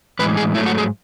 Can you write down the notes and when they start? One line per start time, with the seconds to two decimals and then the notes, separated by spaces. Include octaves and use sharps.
0.19 A2 E3 G#3 B4
0.37 G#4
0.54 G#2 F#3 A3 E4
0.66 F#4
0.78 G#4